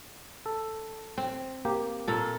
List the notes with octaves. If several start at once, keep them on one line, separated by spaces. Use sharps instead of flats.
A4
C4
A#3 G4
A#2 A4